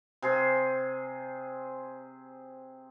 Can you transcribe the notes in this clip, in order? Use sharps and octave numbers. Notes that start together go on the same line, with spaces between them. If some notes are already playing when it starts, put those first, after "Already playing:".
C3 G#4 C5